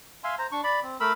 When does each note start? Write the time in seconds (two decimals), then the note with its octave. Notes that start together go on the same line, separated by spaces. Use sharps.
0.24 E5 F5 G#5 C6
0.38 C5 A#5
0.52 D4 C#6
0.64 D5 B5
0.83 C4
1.00 A3 A#4 B5 E6